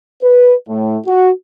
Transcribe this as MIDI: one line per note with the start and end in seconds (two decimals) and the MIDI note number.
0.22 0.54 71
0.69 0.97 45
1.06 1.30 66